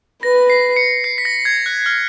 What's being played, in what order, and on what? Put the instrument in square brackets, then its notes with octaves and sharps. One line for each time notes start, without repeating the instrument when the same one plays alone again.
[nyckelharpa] B4 [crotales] A#6
[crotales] C7
C#7
C7
B6
A#6
G#6
F#6
F6